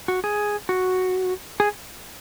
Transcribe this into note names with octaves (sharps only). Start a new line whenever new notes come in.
F#4
G#4
F#4
G#4